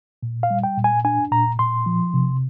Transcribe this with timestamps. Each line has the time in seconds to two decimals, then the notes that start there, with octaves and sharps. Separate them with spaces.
0.23 A#2
0.43 F5
0.50 G3
0.64 G5
0.78 A#2
0.84 G#5
1.05 D4 G#5
1.32 A#2 A#5
1.59 A#2 C6
1.86 F3
2.14 C3